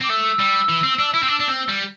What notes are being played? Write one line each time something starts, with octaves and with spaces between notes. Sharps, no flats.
C4 D6
A3 E6
G3
E3
C4
D4
E4
C4
D4
D4
C4
G3